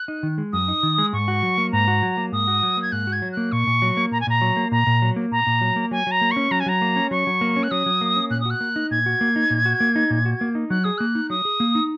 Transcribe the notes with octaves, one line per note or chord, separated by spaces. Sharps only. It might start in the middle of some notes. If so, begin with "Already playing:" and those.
Already playing: F#6
D#4
D#3
G#3
F#2 D#6
D#4
D#3
G#3
G#2 C#6
F#4
F#3
A#3
G#2 A#5
F#4
F#3
A#3
G#2 D#6
F#4
F#3
A#3
G#6
G#2 F#6
F#4
G#6
F#3
A#3 F#6
A#2 C#6
A#2
F#3
A#3
A#2 A#5
G#5
A#2 A#5
F#3
A#3
A#2 A#5
A#2
F#3
A#3
A#2 A#5
A#2
F#3
A#3
F#3 G#5
F#3 A#5
A#3
C#6
C#4
F#3 A#5
G#5
F#3 A#5
A#3
C#4
F#3 C#6
F#3
A#3
C#4
F#6
F#3 D#6
F#3
A#3
C#4
A#2 F#6
D#6
F#4 F#6
A#3
D#4
A#2 G#6
F#4
A#3
D#4
A#2
F#4
A#3
D#4
A#2
F#4
A#3
D#4
F#3 F#6
G#4 D#6
A#3 F#6
D#4
F#3 D#6
G#4
A#3
D#4